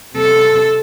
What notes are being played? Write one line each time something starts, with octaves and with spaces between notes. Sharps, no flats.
C3 A4